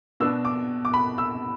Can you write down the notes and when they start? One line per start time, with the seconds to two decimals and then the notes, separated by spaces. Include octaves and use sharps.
0.20 B2 B3 D4 E6
0.45 D6
0.85 D6
0.94 B5
1.18 E6